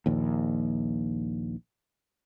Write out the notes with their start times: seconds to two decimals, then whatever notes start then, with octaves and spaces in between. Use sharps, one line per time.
0.06 A#1 D#2